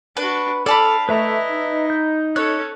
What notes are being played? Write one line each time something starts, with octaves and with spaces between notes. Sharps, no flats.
D4 F#4 B4
A4 C5 D5 F5 A5 B5
A3 E4 B4 D#5 E5 A#5
D#4
G6
C#4 A4 C#5 F#6